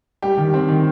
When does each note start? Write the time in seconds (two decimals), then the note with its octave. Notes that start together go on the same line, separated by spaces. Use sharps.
0.22 G3 G4
0.38 D#3
0.54 C4
0.68 D#3